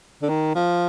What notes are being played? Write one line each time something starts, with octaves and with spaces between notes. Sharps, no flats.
D3
D#3
F3